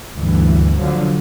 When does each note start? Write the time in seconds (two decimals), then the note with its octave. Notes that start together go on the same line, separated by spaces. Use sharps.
0.16 D2 G2 E3
0.78 D3 F3 F#3